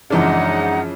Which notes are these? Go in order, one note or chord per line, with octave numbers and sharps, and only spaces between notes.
F#2 C#3 E3 F3 G#3 D4 D#4 F#5